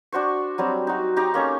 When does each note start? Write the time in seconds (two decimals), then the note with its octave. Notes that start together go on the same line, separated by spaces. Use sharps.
0.12 D4 F#4 C5 C#6
0.58 F#3 G3 C4
0.87 D#4 F#4
1.16 D#4 G4 A#5
1.34 A#3 C#4 A4 C#6